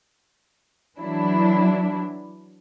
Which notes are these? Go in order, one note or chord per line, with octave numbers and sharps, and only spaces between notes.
E3 F#3 D4 E4